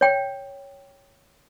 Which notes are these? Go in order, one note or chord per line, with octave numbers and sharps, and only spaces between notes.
C#5 G5